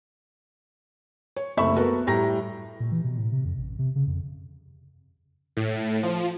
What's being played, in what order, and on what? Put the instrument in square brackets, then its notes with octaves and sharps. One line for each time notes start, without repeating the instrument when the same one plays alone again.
[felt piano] C#5
F#1 C2 A3 E5 B5 C#6
B3 F#4 A4 A#4
A2 G3 G5 A#5 A#6
[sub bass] A#2
E3
B2
A2
C3
F2
A1
C3
C#3
F2
[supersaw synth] A2
F3